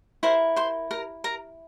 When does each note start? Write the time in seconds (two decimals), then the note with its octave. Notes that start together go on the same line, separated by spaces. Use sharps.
0.23 E4 A#4 C5 C6
0.56 C5 C6
0.91 A#4 A#5
1.24 A#4 A#5